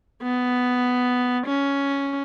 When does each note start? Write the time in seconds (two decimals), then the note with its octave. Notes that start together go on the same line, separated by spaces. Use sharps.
0.23 B3
1.46 C#4